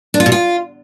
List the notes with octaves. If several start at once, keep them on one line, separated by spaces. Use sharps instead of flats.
D4
F4
B2
F4